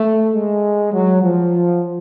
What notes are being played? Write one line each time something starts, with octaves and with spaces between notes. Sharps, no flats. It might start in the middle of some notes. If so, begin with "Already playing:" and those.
Already playing: A3
G#3
F#3
F3